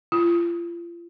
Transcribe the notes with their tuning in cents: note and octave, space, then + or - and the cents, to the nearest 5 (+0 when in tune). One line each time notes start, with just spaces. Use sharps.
F4 -35